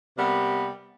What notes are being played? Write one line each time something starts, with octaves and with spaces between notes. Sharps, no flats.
C3 G3 A#3 B3